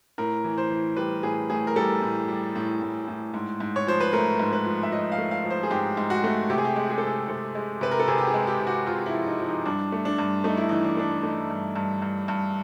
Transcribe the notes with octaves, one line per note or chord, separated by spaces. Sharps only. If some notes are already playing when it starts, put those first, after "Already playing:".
A2 A#4
E3
C5
E3
G3 B4
A2 G#4
A2 G#4
A#4
G3 A4
A2
G3
A2
A2
A2
G#2
G#2
C#5
F3 C5
B4
A3 A#4
G#2
B4
F3
E5
F3 D#5
F5
A3
F5
F3
C5
G#4
G#2 G4
G#2
F#4
A3
C3 G4
G#4
G4
G#3
G#4
A4
C3 G#4
C3 A4
G#3
C3 B4
A#4
A4
C3 G#4
G4
G#4
G#3
G4
C3
F#4
C3 F4
E4
F3
D#4
F3
D#4
G2 D4
A3
D4
G2
A3 D#4
E4
E3 D#4
D4
A3 D4
A3 D#4
G2
G2
G2
G2